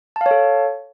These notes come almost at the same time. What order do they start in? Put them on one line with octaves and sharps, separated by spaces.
A5 F5 C#5 A4